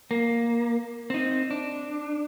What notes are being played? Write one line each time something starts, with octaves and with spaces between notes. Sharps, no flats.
A#3
C4 D#4
D4